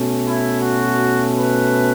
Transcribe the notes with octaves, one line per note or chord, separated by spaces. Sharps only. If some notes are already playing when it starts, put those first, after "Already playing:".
Already playing: B2 A3 C#4
E4
F#4
B4